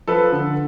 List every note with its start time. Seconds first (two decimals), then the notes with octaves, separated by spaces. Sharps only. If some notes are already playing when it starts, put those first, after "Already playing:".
0.08 F3 A4 B4
0.32 D3